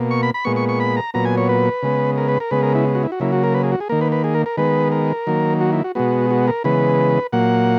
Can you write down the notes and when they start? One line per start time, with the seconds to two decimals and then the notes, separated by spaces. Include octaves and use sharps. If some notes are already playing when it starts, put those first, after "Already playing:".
Already playing: B2 A#3
0.11 C#6
0.23 B5
0.34 B5
0.45 A#2 G#3 B3 C#6
0.56 C#6
0.69 C#6
0.80 B5
0.96 A#5
1.14 A#2 F#3 B3 A#5
1.25 G#5
1.38 C#5
1.49 B4
1.83 C#3 G#3 B3
2.18 A#4
2.28 B4
2.40 A#4
2.51 C#3 G#3 B3 B4
2.62 A#4
2.75 E4
2.95 F#4
3.03 E4
3.12 F#4
3.20 C#3 F#3 A#3 E4
3.32 F#4
3.43 A#4
3.54 B4
3.63 G#4
3.72 F#4
3.80 G#4
3.89 D#3 A#3 A#4
4.01 B4
4.12 B4
4.24 G#4
4.35 A#4
4.46 A#4
4.57 D#3 G#3 B3 B4
4.92 A#4
5.27 D#3 F#3 A#3
5.61 F#4
5.73 E4
5.84 F#4
5.95 B2 G#3 B3 F#4
6.31 F#4
6.47 A#4
6.64 C#3 E3 G#3 B3 B4
7.33 A#2 F#3 A#3 F#5